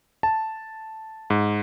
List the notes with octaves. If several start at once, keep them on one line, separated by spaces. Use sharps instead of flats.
A5
G#2